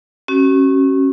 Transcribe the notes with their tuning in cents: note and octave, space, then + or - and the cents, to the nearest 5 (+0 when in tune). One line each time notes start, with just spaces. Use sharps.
C#4 -25 F#4 +35